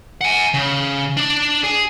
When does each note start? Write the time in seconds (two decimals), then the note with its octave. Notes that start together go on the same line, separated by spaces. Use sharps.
0.21 F#5 G#5
0.54 C#3
1.17 D4 D5
1.64 G#4